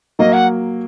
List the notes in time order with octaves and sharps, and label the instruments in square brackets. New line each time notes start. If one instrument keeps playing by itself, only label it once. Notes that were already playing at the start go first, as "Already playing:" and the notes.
[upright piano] F#3 A#3 [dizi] D#5
[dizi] F#5